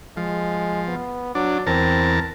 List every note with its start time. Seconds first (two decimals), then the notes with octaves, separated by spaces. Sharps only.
0.17 F3 G#3
0.88 B3
1.35 F#3 D4
1.67 E2 C4 A#4 A5